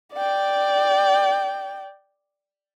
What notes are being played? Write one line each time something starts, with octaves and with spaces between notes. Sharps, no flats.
D5 G5